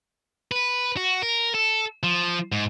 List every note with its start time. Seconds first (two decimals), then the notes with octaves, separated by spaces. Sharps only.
0.52 B4
0.97 F#4
1.22 A#4
1.54 A4
2.03 F3
2.52 G#2